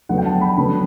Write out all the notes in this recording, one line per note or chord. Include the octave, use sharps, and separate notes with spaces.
D3 F#3 B3 F#5
G5
A5
B5
A5
D3 F#3 B3 B5